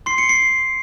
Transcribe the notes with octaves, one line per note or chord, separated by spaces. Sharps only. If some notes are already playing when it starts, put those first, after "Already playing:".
C6 C7
C#7
C7